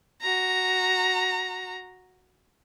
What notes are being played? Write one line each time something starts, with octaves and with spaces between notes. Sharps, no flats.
F#4 A#5